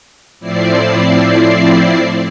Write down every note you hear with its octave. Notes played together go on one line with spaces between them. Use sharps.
A2 F3 C4 E4 D5 C7